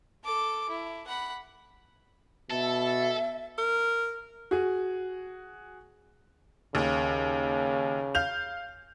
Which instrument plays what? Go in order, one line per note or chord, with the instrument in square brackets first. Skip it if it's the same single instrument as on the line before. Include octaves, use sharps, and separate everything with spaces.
[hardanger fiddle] A4 D6
E4
F#5 B5
[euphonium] B2 [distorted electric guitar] A4 [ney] E5
[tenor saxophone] A#4
[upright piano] F#4 G#4
[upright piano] D#2 [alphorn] C#3
[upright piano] F5 G6 F7